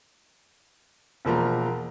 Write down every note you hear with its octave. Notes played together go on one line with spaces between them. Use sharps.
E1 F3 A#3 A#5